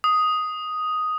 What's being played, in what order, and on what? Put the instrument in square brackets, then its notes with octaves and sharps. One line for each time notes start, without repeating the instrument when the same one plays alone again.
[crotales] D#6